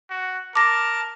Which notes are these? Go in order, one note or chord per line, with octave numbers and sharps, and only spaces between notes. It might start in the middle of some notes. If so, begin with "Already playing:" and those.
F#4
A#4 A5 D6 A#6